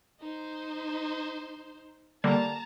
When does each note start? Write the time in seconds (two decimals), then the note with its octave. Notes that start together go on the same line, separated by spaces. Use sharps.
0.20 D#4 C5
2.24 D3 G3 A#3 A5 A#5